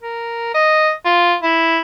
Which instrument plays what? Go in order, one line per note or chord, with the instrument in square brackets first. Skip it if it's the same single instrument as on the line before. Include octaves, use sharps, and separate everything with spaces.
[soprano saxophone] A#4
D#5
F4
E4